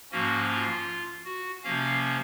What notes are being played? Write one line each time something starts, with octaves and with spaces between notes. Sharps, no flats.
G#2 F3 A#3 C#4 F#4
F4
F#4
C3 F3 A#3 C#4 F5